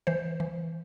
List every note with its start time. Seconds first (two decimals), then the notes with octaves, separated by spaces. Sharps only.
0.07 E3 C5
0.40 E3